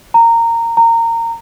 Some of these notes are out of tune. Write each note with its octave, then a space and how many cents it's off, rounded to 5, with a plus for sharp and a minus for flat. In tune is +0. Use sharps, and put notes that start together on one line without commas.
A#5 -15
A#5 -20